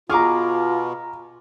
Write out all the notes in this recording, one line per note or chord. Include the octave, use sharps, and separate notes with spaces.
B2 F4 G#4 A#5 C#6 D6 F6